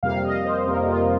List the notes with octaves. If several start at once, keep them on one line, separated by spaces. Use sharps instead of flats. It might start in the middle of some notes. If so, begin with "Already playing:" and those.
F2 C3 G3 A#3 F5
D#5
C5
F2 C3 G3 A#3 A#4
F4